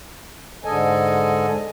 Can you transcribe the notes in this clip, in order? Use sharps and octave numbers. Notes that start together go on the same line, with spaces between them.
G#2 D3 G#3 A4 D#5 G#5